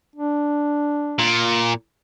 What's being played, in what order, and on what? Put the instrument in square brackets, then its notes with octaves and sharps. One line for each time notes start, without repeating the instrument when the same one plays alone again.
[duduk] D4
[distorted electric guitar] A#2